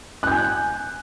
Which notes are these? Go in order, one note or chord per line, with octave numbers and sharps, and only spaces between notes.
G#5 F#6 G6